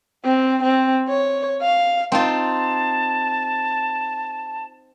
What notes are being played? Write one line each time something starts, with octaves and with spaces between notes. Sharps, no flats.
C4
C4
C#5
F5
C4 D#4 F4 A5